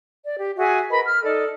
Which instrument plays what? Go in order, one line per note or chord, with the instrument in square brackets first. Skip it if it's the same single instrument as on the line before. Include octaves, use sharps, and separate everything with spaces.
[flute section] D5
G4
F#4 G#4 E5 G#5
A#4 B4 D#5 B5
F6
D#4 A4 D5 D#5